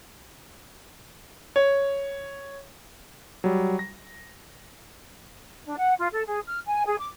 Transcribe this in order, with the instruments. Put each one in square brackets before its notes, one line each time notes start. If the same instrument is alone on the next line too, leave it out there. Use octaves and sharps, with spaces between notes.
[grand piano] C#5
[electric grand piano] F#3 G3
A#6
[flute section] D4
F#5
F4
A4
G#4
F6
G#5
G#4
D6